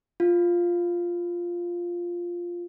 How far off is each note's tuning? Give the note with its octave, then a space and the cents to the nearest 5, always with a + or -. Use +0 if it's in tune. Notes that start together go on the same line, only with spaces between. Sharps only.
F4 +0 F5 +0